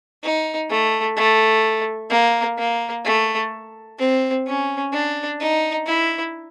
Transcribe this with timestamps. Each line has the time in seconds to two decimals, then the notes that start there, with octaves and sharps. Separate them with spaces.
0.23 D#4
0.70 A3
1.16 A3
2.10 A#3
2.58 A#3
3.05 A3
3.99 C4
4.46 C#4
4.93 D4
5.40 D#4
5.87 E4